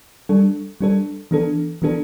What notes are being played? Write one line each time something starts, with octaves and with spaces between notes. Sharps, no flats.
G3 D4 A4
G3 D4 A4
E3 B3 D4 A4
E3 B3 D4 A4